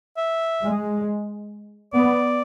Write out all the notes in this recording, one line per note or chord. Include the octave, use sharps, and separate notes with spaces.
E5
G#3
B3 D5